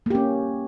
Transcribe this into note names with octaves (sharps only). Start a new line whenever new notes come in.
A#3 C#4 G4